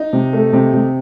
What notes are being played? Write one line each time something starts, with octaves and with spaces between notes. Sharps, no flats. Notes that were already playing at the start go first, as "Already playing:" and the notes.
Already playing: D#4
C3
A3
C3
C3